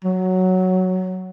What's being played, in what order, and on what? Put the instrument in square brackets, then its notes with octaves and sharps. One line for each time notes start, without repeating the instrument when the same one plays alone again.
[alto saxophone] F#3